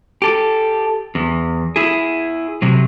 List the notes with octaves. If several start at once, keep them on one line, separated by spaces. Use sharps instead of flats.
G4 A4
E2
E4 G#4
C3 F#3